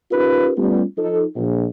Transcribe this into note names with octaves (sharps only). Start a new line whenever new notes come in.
C#4 D#4 F4 G4 A#4 B4
G3 A3 B3 C#4 F4 G4
F3 D#4 A4
A#1